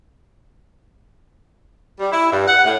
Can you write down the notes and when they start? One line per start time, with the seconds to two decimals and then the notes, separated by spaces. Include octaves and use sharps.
1.99 G3
2.12 E4
2.31 G2
2.47 F#5
2.64 A2